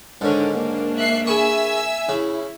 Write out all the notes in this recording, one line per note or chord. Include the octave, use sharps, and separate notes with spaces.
G#2 D3 D#3 C#4 D4
A#3 D4
E5 F#6 C7
G#4 E5 G#5 B5 C#6 E6
C#3 E4